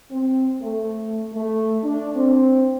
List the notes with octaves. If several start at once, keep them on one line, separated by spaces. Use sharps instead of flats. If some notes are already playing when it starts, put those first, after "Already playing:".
C4
A3
A3
D4
C4